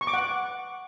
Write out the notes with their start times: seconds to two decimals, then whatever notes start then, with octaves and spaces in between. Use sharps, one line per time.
0.01 C#6
0.07 D6
0.13 F#5